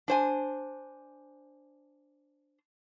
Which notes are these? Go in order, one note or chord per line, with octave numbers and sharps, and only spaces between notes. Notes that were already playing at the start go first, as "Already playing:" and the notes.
D4 C5 G#5